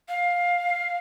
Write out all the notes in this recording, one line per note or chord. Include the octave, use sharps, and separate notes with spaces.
F5